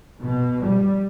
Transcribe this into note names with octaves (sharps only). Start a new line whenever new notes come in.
B2
G3